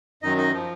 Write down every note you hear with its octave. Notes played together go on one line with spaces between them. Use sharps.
F#2 D#3 F#3 D#4 D#5
D#4 D#5
F3